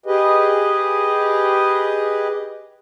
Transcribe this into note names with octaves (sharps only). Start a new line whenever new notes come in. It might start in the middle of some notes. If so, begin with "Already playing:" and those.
G4 G#4 B4 D#5